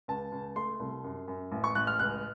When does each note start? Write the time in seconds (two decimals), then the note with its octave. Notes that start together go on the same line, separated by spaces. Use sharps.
0.08 C#2 A5
0.32 C#2
0.56 A3 C6
0.80 C2
1.04 F#2
1.28 F#2
1.52 A1
1.64 C#6
1.75 A1 F#6
1.87 F6
1.99 C#2 F#6